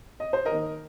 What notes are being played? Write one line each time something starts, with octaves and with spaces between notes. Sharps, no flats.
D#5
C5
A#4 D#5
D#3 A#3